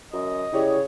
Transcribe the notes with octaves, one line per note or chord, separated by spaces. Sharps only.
F#2 D#5
C#3 E4 G4 C#5 D5